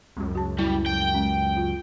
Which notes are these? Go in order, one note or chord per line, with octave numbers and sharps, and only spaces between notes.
C#2 F#2
F#4 A5
G3 E4
G5
G#3 C#4
F4